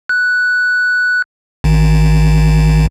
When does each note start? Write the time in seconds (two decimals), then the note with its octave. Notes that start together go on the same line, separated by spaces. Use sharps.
0.09 F#6
1.64 A1 D#3